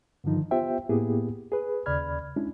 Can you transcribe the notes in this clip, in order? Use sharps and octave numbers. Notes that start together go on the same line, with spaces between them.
G2 D3 D#3 F3 D#4
B3 F4 G4 C5 E5 G5
A2 A#3 B3 E4 G4 G#4
G#4 B4
D#2 C#3 D5 B5 F6 G#6
G#3 C#4 D4 E4